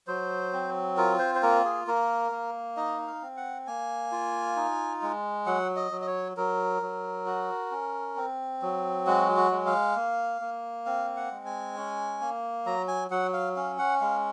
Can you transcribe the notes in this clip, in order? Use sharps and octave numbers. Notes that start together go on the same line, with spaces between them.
F#3 C5
C4
F4 A#4
C5
C5
A#3 A#4
G#4
A#3 A#4
A#3
D#4 D#5
F5
C4
F#5
A#3 G#5
F4
D#4
G#3
F#3 F#5
D#5
F#3
D#5
C#5
F#3 A#4
F#3
F#4
C#4
C4
F#3
G#3 F#4
F#4
G#3
F5
A#3
A#3
C4 F5
F#5
G#3
G#5
C#4
A#3
F#3 A#5
G#5
F#3 F#5
F5
C#4 F5
F#5
G#3 F5